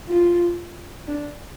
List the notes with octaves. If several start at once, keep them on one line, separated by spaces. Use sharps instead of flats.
F4
D4